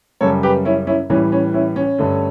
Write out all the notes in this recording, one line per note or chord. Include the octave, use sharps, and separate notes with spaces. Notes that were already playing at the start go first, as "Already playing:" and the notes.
F#2 C#3 G3 A4 C#5
G4 B4
C#4 E4
C#4 E4
A2 E3 G3 C#4
C#4
C#4 E4
C#4
G2 D3 A3